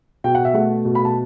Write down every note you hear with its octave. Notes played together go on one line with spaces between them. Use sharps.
B2 G5
F#5
E5
A3 F#5
B2
B5
A5